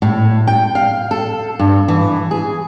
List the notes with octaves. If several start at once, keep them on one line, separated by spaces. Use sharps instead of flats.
A2
G5
F5
A4
G2
E3
G#4